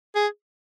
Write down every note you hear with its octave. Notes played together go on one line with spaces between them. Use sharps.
G#4